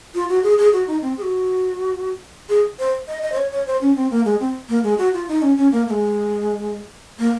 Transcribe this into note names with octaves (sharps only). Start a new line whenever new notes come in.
F4
F#4
G#4
G#4
F#4
D#4
C4
G#4
F#4
G#4
C5
D#5
D#5
C5
C#5
C#5
C5
C#4
C4
A#3
G#3
C4
A#3
G#3
F#4
F4
D#4
C#4
C#4
A#3
A#3
G#3
A#3